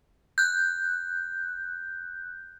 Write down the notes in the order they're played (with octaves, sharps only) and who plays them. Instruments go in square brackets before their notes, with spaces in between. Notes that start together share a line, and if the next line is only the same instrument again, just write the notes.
[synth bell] F#6 G6